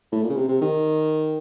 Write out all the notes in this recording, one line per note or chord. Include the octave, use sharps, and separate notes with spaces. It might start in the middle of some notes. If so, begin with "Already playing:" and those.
A2
A#2
C#3
C3
C3
D#3